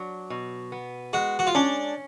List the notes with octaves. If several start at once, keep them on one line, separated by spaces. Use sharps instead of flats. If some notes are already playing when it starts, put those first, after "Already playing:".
Already playing: F#3 D4
B2
B3
G#3 F#4
F#4
F4
C#4 D4